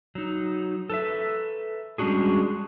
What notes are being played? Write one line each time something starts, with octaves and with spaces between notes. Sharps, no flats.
F#3 D#4
A4 B4 E5
G3 G#3 C#4 D4 F#4 G#4